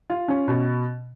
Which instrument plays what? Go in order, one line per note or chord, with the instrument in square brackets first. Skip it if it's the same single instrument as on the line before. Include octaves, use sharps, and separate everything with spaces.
[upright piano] F4
C#4
B2